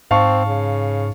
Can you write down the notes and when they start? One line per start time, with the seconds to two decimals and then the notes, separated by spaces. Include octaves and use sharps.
0.11 G#2 C4 F5 A5 C#6
0.46 C#3